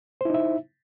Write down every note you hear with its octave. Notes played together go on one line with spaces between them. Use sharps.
D#4 E4 C5 E5